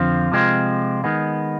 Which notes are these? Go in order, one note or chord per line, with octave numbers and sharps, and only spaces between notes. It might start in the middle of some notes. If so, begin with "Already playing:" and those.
Already playing: F2 D3 F3 C4 F4
C3 F3 G#3 C4 F4
D#3 G#3 B3